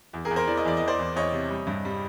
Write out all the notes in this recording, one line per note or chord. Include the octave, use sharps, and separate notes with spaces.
E2
G#4 A#4
E2
A#4 C5
E3 D5
D#5
E2 D5
E2 D#5
C5 D5
E2
E2 C#5 D#5
C3
G3
G2
G3